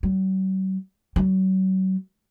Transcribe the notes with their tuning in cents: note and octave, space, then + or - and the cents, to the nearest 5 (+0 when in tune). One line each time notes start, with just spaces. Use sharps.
F#3 +45
F#3 +35